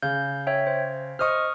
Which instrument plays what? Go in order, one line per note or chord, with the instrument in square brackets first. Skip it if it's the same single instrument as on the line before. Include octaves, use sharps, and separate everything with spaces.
[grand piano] C#3 [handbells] G6
[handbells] C#5 E5 G5
C5
[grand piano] C5 D#5 [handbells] C#6 D#6 F6